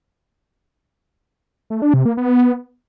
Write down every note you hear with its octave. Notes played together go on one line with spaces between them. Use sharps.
A3
D4
C3
A#3
B3